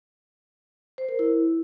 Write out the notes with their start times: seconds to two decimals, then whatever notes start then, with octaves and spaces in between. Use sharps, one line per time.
0.98 C5
1.09 A#4
1.19 E4